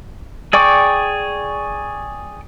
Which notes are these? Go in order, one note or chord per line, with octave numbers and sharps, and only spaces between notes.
G#4 D5 G5 C#6 D6